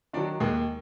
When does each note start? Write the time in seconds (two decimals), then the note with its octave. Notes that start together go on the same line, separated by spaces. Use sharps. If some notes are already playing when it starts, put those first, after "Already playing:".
0.13 D#3 F#3 D4 D5
0.40 D#2 G#3 G#4